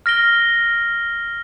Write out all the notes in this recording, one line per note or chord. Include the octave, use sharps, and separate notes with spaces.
F6 A#6 D7 G7